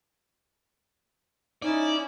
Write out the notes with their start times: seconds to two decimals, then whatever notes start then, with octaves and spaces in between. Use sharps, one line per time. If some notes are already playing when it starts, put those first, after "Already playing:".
1.62 C#4 D#4 E4 D5